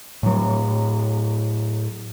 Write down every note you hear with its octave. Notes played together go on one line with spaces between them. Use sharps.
A2 F#3